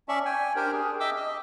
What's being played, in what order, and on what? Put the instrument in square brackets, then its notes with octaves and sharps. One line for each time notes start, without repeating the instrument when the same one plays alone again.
[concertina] C#4 D5 E5 A5 C#6
G5 G#5
D4 G4 A#4 C5 G5
G#4
D#5 E5 G5 D6 E6
D#5